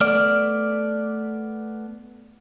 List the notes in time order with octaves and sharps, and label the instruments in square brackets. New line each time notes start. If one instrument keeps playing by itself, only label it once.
[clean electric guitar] A3 B3 D5 [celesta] F6